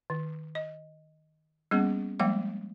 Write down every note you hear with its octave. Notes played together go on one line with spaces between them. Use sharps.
D#3
D#5
G3 A#3 B3 C#4 G#4
F3 G3 G#3 A#3 F5 G5